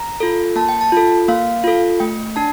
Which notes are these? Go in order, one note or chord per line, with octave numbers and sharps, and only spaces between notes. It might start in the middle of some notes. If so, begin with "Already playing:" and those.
Already playing: A#5
F4 A4
A#3 A5
G5
A5
F4 A4
A#3 F5
F4 A4
A3 G5
D4 A5